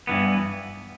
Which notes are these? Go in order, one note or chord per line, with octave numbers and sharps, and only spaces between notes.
G2 E3 B3